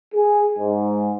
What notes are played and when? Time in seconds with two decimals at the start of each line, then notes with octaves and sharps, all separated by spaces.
0.14 G#4
0.58 G#2